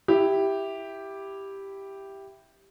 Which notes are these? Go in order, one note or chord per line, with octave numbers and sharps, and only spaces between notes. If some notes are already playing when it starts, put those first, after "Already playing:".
E4 G4